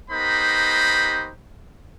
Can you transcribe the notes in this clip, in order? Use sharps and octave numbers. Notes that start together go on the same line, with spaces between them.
B3 D#4 G4 A#4 C5 B5